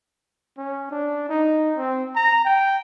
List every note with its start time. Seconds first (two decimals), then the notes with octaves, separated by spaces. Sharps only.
0.58 C#4
0.91 D4
1.29 D#4
1.78 C4
2.16 A#5
2.45 G5